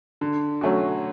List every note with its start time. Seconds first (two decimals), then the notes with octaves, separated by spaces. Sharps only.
0.21 D3
0.61 F#3 A3 C#4 F#4